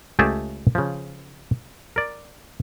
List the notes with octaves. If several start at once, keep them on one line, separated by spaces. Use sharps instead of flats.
C#2 A3 G4 G#4 E5 A5
C#3 F3
A#4 D5